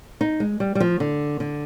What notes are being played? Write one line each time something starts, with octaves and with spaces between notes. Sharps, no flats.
D#4
G#3
G3
G3
F3
D3
D3